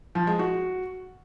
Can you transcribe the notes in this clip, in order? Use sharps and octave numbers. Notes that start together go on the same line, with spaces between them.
F3
G#3
F#4